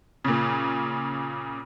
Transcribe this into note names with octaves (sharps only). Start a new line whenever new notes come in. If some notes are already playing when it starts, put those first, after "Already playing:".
A#2 C#3